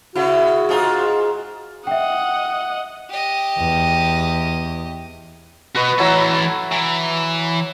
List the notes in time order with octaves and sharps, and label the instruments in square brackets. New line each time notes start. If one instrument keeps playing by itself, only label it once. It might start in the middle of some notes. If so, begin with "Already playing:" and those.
[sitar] C#3 E4 [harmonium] F#4
[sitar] G#2 F4 G#4
[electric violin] D#5 F#5 [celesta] E5 G5
[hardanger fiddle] G4 D#5
[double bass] E2
[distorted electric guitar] F#4 D#5 [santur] B4 C#6
[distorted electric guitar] E3 A4 [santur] F#3 E4 A#5
[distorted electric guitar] E3